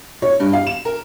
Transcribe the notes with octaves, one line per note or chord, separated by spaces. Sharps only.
C#5
G2
F5
E7
A#4